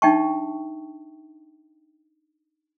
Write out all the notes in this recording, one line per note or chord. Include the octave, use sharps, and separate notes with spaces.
D4 D#4 E5 G5 A5 C#6